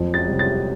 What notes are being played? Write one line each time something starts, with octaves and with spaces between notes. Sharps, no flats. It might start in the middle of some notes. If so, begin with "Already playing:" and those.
Already playing: F2
A6
C3 G3
A6